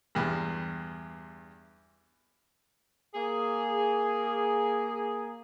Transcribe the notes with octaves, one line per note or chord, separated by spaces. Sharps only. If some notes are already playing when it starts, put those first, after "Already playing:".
E2 G2
A#3 G#4